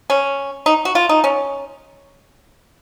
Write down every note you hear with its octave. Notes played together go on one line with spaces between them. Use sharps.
C#4
D#4
F#4
F4
D#4
C#4